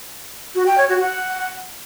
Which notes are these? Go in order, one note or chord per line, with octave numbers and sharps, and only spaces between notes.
F#4
G5
C#5
F#4
F#5